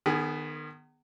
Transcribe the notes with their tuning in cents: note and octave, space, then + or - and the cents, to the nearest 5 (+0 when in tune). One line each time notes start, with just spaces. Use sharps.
D#3 -35 B3 +0 G#4 +5